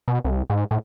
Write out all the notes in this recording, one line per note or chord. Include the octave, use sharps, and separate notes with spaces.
B2
C2
G#2
A2